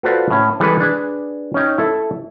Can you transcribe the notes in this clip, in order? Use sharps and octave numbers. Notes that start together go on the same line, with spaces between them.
F4 F#4 A4 B4 C5 D5
A2 C#4
E3 G3 G#3 A4 B4
D4 G#4 B4
C#4 D#4 G5
E4 A4 E5